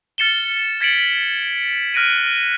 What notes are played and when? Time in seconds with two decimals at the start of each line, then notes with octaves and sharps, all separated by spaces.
0.18 F6 A6 C#7 E7 G7
0.81 G#6 A6 B6 C#7 D7 F#7
1.94 F6 F#6 A#6 D7 D#7